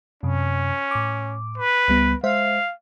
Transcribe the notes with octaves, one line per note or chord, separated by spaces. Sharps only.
F#2 C3 C#4
A2 D6
B4
C#2 G3 B3
G#3 C5 E5 F5